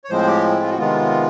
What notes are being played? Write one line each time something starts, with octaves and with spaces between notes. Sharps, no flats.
C#5
A2 F3 G#3 C4 C5
G4
F4
F#4
C3 D#3 G#3 B3 F4